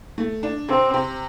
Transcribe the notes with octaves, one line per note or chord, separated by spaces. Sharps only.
A3
D4
C3 C4
C3